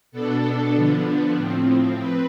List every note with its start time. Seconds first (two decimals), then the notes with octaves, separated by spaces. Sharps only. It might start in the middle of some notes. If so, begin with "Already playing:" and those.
0.12 B2 B3 D4 A4
0.74 D3 F3 B3 D4
1.35 A2 F3 C4
1.98 C4 B4